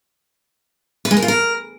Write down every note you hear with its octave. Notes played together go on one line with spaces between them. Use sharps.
B4
G#3
A#4
F4
A#4